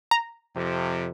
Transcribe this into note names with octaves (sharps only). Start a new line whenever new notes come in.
A#5
F2 C3